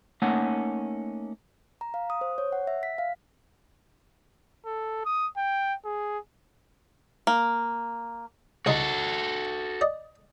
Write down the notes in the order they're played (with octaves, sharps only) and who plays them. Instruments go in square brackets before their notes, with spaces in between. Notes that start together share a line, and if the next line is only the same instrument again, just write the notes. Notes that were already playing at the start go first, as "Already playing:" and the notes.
[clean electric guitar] A3 A#3 C#4 D#4 F#5
[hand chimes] A#5
F5
D#6
C5
C#5
F#5
E5
B6
F5
[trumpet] A4
D#6
G5
G#4
[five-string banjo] A#3
[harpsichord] C2 D#4 C6 [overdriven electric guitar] F#4 A4
[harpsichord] D5 D#5